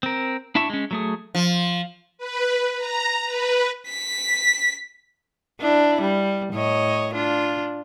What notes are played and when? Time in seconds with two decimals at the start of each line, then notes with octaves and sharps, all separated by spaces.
0.03 C4 A#4
0.55 D4 E4 E5 A5 C#6
0.70 G#3 C#4
0.91 F#3 A3 G#4
1.35 F3
2.18 B4
2.76 A#5
3.26 B4
3.88 B6
5.60 D4 E4
6.01 G3
6.53 A2 C#5 D#5
7.14 D4 F4